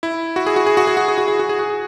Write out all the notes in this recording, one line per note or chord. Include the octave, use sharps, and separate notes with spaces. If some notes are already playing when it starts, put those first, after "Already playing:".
E4
F#4
G#4
F#4
G#4
F#4
G#4
F#4
G#4
F#4
G#4
F#4
G#4
F#4
G#4